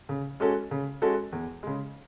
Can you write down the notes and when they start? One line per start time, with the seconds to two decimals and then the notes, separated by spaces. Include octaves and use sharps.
0.09 C#3
0.40 G#3 C#4 F#4 A4
0.71 C#3
1.02 G#3 C#4 F#4 A4
1.33 E2
1.63 C#3 G#3